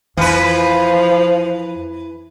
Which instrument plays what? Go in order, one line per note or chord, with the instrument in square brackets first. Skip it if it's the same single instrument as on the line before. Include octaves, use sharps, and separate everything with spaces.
[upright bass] F2 [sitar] E3 B4 [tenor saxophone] F3